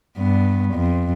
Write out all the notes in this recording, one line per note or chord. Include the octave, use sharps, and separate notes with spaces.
G2 B3
F2